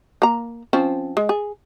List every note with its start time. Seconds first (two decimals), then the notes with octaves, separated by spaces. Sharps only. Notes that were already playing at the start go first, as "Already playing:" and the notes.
0.22 A#3 A#5
0.73 F3 C4 C#4
1.17 G#3
1.29 G#4